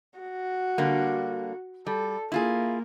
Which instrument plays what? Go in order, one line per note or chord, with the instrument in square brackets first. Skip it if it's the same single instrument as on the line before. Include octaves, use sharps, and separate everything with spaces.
[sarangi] F#4
[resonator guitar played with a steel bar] D3 G3 A#3
[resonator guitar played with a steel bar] G3 [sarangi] A4
[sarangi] A#3 [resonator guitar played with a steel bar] E4 F4 G#4